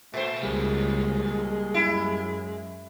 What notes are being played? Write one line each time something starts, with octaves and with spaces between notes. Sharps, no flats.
A#2 A3 C5
C#2 G3 G#3 A#3
F#2 E4